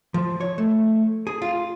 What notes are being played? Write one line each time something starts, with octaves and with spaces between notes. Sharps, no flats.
F3
C#5
A3
G#4
F4